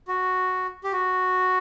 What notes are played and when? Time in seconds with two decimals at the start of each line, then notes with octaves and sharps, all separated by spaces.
0.08 F#4
0.84 G4
0.92 F#4